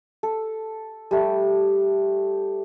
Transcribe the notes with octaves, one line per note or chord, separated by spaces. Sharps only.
A4
G3 A3